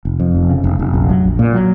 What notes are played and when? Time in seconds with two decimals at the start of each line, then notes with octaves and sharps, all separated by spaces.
0.05 F1
0.20 F2
0.35 F1
0.50 C#3
0.64 F1
0.79 F1
0.94 A#1
1.09 F#3
1.24 A#1
1.39 A#2
1.54 F#3